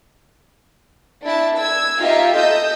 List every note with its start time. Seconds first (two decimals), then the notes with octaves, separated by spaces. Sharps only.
1.24 D4 E4 A5
1.59 E6 G#6
2.02 D#4 F4 G4 E5 F5
2.36 A4 D#5 D#6 E6 G6